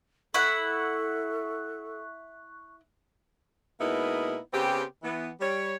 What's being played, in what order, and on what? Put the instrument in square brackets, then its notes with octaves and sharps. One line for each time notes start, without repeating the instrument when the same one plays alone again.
[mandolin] E4 F#5 [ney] A4 [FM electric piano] C#6 F#6
[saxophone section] B2 G#3 A#3 B3 D#4 E4
C#3 B3 C4 G4
E3 B3
G3 C#5